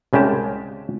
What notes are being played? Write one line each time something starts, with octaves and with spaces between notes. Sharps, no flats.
C2 C#3 G#3 G4 A5